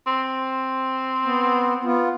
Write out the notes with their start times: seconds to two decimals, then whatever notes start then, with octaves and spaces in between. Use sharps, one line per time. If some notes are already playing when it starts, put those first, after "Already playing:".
0.07 C4
1.25 B3
1.85 B3 F4